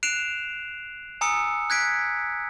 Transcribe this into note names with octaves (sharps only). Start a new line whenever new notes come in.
F#6 C7 D7 E7 F7
G#5 A#5 D#6 E6 C#7
F#6 G#6 B6 D7